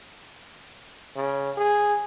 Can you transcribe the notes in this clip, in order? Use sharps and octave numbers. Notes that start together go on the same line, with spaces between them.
C#3
G#4